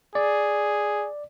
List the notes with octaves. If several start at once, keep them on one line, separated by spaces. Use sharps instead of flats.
G#4 D5